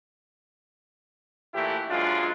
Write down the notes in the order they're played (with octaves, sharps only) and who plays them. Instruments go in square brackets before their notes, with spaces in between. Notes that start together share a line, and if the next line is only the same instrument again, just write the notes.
[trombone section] A#2 E3 A3 E4 G4
F#2 F3 G#3 D4 F4